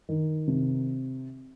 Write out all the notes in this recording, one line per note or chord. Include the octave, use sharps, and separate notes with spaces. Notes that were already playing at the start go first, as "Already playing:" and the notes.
D#3
C3